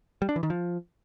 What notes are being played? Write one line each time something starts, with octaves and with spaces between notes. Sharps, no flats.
G3
D4
E3
D#3
F3